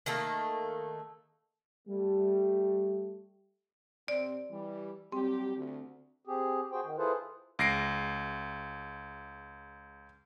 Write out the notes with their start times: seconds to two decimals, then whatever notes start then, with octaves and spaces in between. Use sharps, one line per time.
0.06 D#3 A3 A#3 A4
1.88 G3 A3 G4
4.08 C3 C4 D5
4.51 E3 G3
5.12 F#3 G3 C4 G4
5.57 D2
6.27 C4 G4 G#4
6.72 F#4 G#4 C5 G5
6.84 D#3
6.98 E4 F4 G#4 A4 B4 C5
7.59 C#2 A#6 C7 D7